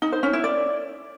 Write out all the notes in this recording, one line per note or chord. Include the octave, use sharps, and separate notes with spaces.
D#4
C5
C#4
E4
D5